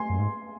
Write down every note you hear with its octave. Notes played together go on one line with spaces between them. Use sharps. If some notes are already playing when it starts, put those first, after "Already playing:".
Already playing: G#5 C6
F#2
G#2